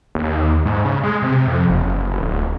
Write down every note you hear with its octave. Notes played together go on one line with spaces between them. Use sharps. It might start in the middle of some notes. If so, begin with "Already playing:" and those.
D#2
G#2
C#3
G#3
C3
F2
F#1
D1